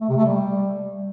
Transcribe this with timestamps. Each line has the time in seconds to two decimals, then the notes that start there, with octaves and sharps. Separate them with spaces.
0.01 A3
0.09 C3
0.17 A3
0.25 G3